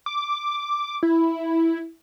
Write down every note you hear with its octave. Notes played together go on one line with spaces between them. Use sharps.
D6
E4